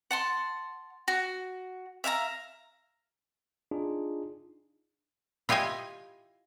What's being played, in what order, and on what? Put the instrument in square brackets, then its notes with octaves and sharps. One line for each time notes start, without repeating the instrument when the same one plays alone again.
[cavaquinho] F#5 A5 C6
F#4
E5 F5 G#5 A#5
[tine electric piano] D4 D#4 F4 G#4
[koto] E4 F4 G4 D#5 G#5